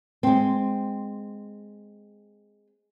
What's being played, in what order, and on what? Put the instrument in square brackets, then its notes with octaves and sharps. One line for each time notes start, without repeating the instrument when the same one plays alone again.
[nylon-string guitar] G#3 C4